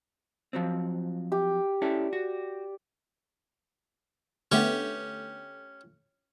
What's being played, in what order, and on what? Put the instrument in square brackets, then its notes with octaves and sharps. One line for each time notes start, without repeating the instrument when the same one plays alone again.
[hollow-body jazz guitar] F3 F#3 C4
[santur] G4
[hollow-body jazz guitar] C#4 E4 A4 [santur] D5
[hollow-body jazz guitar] F#4
[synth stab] D3 A3 B3 [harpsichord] C#4 G4 G5